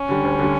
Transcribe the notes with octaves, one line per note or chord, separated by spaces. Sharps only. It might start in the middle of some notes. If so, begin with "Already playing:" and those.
Already playing: C#4
D3 G3
D2
D3 G3